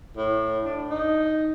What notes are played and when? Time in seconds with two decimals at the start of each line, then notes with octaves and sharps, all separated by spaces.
0.17 A2
0.65 D4
0.90 D#4